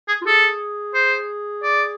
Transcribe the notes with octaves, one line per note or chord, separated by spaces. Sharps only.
G#4
F4
G#4 A4
C5
D5